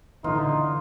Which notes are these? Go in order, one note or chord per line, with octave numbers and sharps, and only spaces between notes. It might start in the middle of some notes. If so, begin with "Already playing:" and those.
D3 E3 D#4 F4